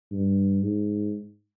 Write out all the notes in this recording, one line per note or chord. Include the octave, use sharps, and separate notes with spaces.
G2
G#2